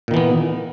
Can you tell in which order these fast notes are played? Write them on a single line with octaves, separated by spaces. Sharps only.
A#2 D#3 E3 B3